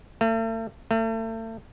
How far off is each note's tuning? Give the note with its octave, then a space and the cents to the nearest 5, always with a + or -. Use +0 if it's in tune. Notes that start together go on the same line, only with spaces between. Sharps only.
A3 +40
A3 +35